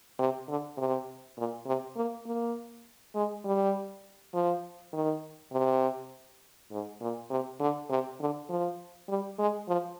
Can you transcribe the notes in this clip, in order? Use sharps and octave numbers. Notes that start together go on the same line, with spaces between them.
C3
D3
C3
A#2
C3
A#3
A#3
G#3
G3
F3
D#3
C3
G#2
A#2
C3
D3
C3
D3
F3
G3
G#3
F3